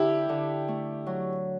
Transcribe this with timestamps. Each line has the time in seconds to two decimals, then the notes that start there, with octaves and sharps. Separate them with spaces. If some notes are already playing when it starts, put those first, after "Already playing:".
Already playing: D3 E4 G4
0.29 D3
0.68 A3
1.06 F#3